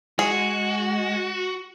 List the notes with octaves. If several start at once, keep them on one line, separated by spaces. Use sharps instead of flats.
G#3 F#4 G#4